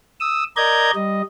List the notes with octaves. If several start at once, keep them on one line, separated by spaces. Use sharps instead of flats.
D#6 E6
A#4 D5 D#5 A#5 G6 G#6
G3 D#5